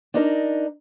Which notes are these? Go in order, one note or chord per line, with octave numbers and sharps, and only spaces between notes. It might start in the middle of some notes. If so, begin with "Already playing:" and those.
D4 D#4 A#4